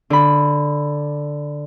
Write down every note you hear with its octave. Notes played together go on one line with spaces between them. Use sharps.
D3 B5